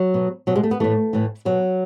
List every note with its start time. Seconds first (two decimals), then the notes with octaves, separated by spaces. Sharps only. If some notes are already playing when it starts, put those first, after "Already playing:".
Already playing: F#3
0.14 B2
0.47 B2 F#3
0.56 G#3
0.63 A3
0.71 B3
0.80 A2 E3 A3
1.13 A2 E3
1.45 B2 F#3